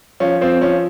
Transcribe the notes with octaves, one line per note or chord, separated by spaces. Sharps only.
F3 C#4
F3 C4
F3 C#4